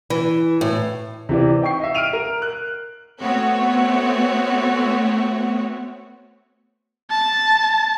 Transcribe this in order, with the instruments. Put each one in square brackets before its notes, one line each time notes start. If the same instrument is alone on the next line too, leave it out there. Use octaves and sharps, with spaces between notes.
[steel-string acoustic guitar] E3
A2
[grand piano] C3 E3 D5
D#4 G5 C#6 C7
D#5 E5
F6 D7 D#7 F7
A#4
F#6
[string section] A3 B3 C4 F#4 C#5
[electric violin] A5